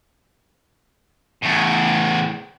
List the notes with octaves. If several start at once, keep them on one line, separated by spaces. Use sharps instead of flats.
E2 A2